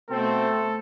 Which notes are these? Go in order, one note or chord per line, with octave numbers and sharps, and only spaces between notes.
B2 A3 C4 A4